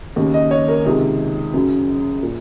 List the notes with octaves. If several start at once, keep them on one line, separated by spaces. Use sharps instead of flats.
D#2 C#3
D#5
C#5
A#4
C#2 C3 D#3 G#4
F#2 C#3
A#2